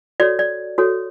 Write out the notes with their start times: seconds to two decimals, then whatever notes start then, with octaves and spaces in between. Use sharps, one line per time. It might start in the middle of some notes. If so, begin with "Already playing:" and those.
0.20 F#4 A4 C#5 D5
0.39 D5
0.78 F#4 A4 C#5